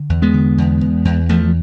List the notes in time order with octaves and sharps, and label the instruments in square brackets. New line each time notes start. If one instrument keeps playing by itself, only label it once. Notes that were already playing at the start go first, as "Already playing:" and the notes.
Already playing: [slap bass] D3
E2
G#3 B3
D3
E2
E2
E2
E2 F3 A3